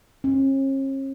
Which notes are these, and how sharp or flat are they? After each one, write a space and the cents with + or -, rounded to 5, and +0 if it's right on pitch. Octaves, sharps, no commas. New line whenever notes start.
C#4 -45